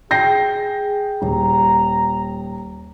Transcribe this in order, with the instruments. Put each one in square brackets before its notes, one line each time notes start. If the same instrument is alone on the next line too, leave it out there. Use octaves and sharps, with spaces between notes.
[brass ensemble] G#4 [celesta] G5 [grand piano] G6 A#6 C7
[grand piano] D#1 [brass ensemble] A#5